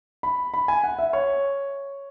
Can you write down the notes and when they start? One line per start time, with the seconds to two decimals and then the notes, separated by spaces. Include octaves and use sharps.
0.23 B5
0.54 B5
0.68 G#5
0.84 F#5
0.99 E5
1.13 C#5